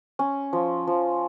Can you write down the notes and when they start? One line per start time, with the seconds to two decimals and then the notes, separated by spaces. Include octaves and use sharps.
0.19 C#4
0.53 F3
0.87 F3